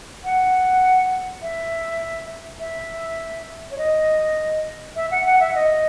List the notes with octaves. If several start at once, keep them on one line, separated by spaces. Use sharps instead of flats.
F#5
E5
E5
C#5
D#5
E5
F#5
F#5
E5
D#5